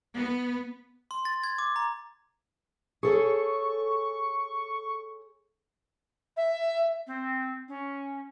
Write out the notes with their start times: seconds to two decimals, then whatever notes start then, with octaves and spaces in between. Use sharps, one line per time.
0.15 B3
1.11 C6
1.25 A6
1.44 G#6
1.58 D6
1.76 A#5
3.03 G#4 A4 C#5 C#6
6.36 E5
7.07 C4
7.68 C#4